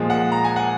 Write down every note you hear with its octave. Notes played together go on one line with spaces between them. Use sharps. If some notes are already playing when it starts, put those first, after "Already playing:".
Already playing: A#2 F3 G#3
F#5
A#5
G#5
F#5